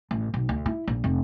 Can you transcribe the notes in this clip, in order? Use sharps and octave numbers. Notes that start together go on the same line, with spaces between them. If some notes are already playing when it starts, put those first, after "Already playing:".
A1
B1
D2
E4
A#1
F1